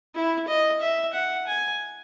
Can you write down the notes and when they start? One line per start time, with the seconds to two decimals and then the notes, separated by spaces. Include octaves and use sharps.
0.15 E4
0.48 D#5
0.81 E5
1.13 F#5
1.47 G#5